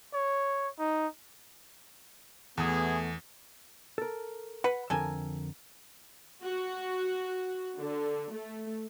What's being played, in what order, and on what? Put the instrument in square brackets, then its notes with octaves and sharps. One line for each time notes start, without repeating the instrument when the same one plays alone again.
[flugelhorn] C#5
D#4
[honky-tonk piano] E2 [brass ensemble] A3 B3 [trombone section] E4 F#4 G#4
[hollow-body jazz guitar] A4 A#4
[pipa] B4 [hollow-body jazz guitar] F#5
[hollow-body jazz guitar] F2 D3 A#4 [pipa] A4 G#5
[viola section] F#4
D3
A3